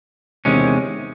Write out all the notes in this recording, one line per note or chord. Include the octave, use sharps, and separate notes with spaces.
E2 C3 D#3 G#3 C#4